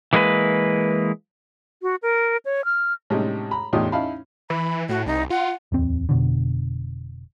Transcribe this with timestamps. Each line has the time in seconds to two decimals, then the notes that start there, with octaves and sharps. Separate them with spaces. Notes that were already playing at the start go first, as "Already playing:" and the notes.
0.13 E3 G#3 A#3 D4 B4
1.82 F#4
2.03 A#4
2.45 C#5
2.65 F6
3.10 A2 C3 G3 G#3 C#4 D#4
3.51 A#5 B5
3.73 E2 A2 D#4 F4 G4 D#6
3.92 C#4 D#4 E4 F5 A5 B5
4.50 E3 B5
4.89 A2 F#4
5.06 C2 D#4
5.30 F4 F#5
5.72 D1 E2 C4
6.09 F1 B2 D3